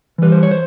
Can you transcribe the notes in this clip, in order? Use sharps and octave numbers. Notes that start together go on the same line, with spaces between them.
E3 G3 B4
C5
C#5
C5